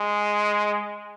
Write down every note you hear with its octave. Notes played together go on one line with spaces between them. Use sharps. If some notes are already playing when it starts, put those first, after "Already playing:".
Already playing: G#3